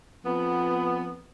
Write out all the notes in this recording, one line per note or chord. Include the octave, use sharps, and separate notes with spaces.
F2 B3